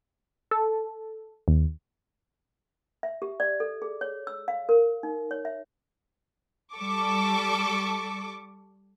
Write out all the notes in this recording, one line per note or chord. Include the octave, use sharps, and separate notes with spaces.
A4
D#2
E5
G4
D5
A4
G#4
C#5
E6
F5
A#4
D#4
C#5
E5
G3 A4 C#6 D6